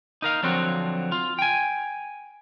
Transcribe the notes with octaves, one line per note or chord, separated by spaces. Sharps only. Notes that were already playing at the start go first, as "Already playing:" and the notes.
D#4 A#4 F5
D3 F3 F#3 C4 F#4
F4
G5 G#5